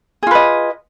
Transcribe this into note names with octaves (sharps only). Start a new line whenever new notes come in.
F4 G#4 B4 D#5